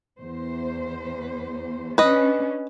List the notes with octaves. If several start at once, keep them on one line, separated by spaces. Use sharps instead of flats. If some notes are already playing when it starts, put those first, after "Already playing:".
E2 C5
C#4 D4 B4 D#5